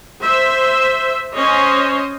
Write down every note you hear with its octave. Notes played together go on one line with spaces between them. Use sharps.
C5 E5
C#4 C5 C#5 D#5